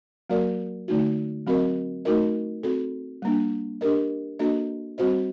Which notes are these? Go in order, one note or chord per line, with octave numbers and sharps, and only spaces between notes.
F#3 A#3 F#4 A#4 D5
D3 A3 D#4 F#4
F#3 C4 F#4 A#4 D#5
A3 D#4 F#4 A#4 D#5
C4 F#4 A4
G3 A#3 D4
D4 G4 A#4 D#5
A#3 D4 F#4 A4 D#5
G3 C4 F#4 C5 D#5